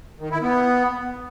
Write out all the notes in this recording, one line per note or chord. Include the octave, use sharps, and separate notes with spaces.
D#3
E4
B3